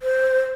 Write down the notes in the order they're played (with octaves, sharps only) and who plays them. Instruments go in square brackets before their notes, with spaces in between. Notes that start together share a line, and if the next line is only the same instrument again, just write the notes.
[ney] C5